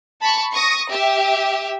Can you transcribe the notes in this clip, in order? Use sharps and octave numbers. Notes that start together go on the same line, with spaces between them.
A5 B5 C#6
C#6 D#6 A#6
G4 E5